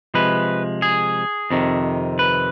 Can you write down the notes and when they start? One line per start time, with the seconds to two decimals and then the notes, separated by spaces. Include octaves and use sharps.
0.14 C3 F3 G#3 B4
0.82 G#4
1.51 F2 C3 D#3
2.19 B4